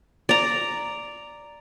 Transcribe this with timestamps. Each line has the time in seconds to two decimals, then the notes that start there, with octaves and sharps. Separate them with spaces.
0.29 D5 A#5